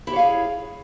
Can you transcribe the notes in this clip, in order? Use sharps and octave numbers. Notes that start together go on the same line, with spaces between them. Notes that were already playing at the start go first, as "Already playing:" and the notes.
E4 G4 G#4 C#5 F5